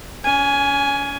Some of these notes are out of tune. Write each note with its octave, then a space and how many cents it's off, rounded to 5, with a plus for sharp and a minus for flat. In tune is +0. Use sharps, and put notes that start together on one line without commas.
C#4 +35 G#5 +5